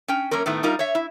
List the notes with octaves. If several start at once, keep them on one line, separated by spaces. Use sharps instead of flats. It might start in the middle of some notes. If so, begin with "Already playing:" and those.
C#4 G5
F#2 A#3 C#4 A#4
A2 D#3 A3 B3
G3 D#4 F4 A#4
C#5 E5
E4